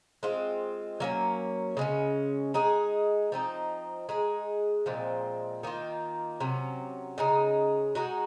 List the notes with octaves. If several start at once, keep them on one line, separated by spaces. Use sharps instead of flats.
G#3 C4 F4
F#3 A#3 C#4
C#3 G#3 C#4
G#3 D#4 G#4
F3 C4 D#4
G#3 D#4 G#4
A#2 F3 G#3 C4
D#3 A#3 F4
C3 F#3 C#4
C#3 G#3 D#4
G#3 D#4 F#4